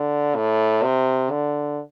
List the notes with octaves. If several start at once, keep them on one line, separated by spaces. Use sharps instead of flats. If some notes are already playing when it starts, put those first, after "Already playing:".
Already playing: D3
A2
C3
D3